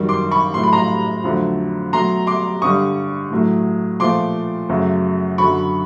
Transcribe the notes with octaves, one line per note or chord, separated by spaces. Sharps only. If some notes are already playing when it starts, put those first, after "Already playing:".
Already playing: F#2 D#3 G3
C6 D6
B5 C#6
A2 F#3 A3 C6
B5
A#5 C6
F2 D3 F#3 A3
B2 F#3 A3 A#5 C6
C6 D6
G2 D3 G3 C#6 D#6
A2 F#3 A3
A#2 F3 A3 C6 D6
F#2 C#3 F#3 A3
F#2 D3 F#3 B5 C#6